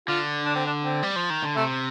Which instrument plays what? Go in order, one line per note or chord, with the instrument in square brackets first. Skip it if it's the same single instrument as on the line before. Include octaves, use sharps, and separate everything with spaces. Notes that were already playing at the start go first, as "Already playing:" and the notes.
[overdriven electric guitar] D3 [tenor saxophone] F4
[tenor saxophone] D4
C4
D4
C4
[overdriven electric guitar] G3
F3
D#3
D3
[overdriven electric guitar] C3 [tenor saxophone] A3